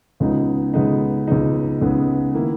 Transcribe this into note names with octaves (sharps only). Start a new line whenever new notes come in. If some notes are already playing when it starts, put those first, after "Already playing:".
C#2 C#3 G#3 B3 D#4
C#2 C#3 G#3 B3 D#4
C#2 C#3 G#3 B3 D#4
C#2 C#3 G#3 B3 D#4
D#3 A#3 E4